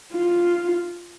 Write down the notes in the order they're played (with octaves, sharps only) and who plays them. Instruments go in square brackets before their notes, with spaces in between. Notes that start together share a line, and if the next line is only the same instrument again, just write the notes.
[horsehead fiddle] F4